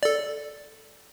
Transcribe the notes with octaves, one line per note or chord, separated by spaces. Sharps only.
A4 D5